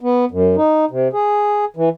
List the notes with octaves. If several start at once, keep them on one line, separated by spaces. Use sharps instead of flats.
B3
F#2
D#4
C3
G#4
E3